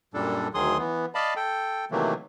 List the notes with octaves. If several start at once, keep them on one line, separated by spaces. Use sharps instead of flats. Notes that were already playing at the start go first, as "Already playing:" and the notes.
F#2 A#2 G3 D4 A4
D2 D#3 F#3 G#4 C6 D#6
E3 B3
D5 D#5 F5 A5 B5
A4 G5
C3 D#3 E3 F#3 A3 A#3